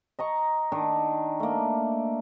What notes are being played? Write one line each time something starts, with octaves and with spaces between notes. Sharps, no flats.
D#5 A#5 C#6
D#3 D4 A#4
A3 A#3